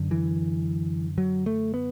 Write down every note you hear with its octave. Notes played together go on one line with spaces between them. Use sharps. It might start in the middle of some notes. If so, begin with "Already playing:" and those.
Already playing: F#2 D3
E3
F#3
A3
B3